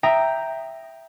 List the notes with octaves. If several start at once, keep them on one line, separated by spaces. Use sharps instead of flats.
E5 G5 A#5 D#6 A#6